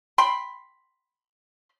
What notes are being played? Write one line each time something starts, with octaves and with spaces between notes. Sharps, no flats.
G5 B5 C6